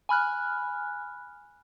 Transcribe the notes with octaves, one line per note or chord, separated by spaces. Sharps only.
G#5 B5 F6 F#6